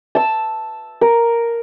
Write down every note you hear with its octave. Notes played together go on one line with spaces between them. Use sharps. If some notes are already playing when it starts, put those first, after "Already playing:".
A5 E6
A#4